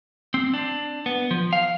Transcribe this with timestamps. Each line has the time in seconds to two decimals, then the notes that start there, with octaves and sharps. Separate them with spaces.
0.34 C4
0.54 D4
1.06 B3
1.31 F3
1.53 F5